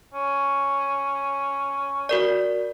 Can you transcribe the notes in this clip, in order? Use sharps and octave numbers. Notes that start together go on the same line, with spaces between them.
C#4
F#4 A#4 D5